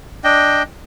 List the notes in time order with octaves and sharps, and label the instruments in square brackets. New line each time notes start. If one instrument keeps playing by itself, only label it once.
[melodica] D4 D#5 G5